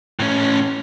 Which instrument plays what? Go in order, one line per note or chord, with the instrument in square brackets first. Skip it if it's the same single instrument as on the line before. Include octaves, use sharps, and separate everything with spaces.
[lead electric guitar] A2 C#4